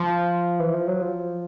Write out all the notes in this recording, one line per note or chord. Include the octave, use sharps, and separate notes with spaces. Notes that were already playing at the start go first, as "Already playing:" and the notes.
Already playing: F3
E3
F3
F#3
F3